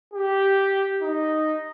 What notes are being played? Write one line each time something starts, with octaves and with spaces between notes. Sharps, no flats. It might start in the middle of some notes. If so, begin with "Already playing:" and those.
G4
D#4